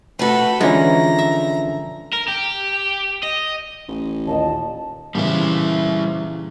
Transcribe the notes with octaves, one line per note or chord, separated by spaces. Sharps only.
A3 F#4 A4 B4
D3 E3 F3 G#3 C#4 E4 A#5
E5
A#4
G4
D#5
A1
D#2 A#2 D#5 A5
A#2 C#3 E3 G3 E4